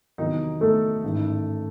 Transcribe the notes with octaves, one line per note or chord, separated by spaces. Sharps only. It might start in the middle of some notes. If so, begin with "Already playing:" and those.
E2 C3 D#3 F#3 D#4
A3 A4
A1 G#2 D#3